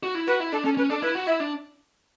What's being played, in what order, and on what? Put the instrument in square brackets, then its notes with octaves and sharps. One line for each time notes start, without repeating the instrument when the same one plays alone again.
[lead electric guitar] F#4
E4
[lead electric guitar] F#4 [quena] B4
[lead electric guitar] E4
[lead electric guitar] D4 [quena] A4
[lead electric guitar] C#4 [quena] A4
[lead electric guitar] C#4 [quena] B4
[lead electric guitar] D4 [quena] A4
[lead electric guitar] E4 [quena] B4
[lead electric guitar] F#4
[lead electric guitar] E4 [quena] E5
[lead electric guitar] D4